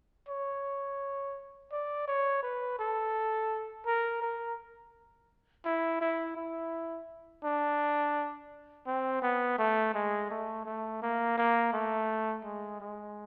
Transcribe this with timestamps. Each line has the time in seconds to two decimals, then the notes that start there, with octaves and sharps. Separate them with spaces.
0.29 C#5
1.72 D5
2.08 C#5
2.43 B4
2.79 A4
3.86 A#4
4.22 A#4
5.65 E4
6.01 E4
6.37 E4
7.44 D4
8.87 C4
9.22 B3
9.59 A3
9.94 G#3
10.30 A3
10.65 A3
11.02 A#3
11.38 A#3
11.73 A3
12.44 G#3
12.80 G#3